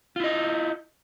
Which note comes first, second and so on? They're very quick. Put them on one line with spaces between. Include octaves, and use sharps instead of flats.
F4 E4 D#5